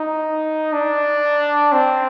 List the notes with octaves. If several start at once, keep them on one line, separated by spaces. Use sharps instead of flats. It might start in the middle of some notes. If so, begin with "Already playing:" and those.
Already playing: D#4
D4
C4